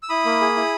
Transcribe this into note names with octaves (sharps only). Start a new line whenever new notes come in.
E6
E4 B5 D#6
A#3
G#4
E4